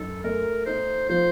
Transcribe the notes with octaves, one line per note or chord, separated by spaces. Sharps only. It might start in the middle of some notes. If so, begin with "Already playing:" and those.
Already playing: F#2 D#4 A4
A3 A#4
D#4 C5
F3 C5